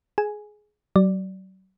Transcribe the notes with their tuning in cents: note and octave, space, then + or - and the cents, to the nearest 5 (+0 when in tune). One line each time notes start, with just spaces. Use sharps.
G#4 +15 G#5 +0
F#3 +35 D5 +0